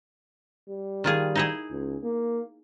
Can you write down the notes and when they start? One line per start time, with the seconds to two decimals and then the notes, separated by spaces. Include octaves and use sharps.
0.69 G3
1.04 D#3 F4 G#4
1.35 D#4 E4 G#4
1.71 C#2
2.03 A#3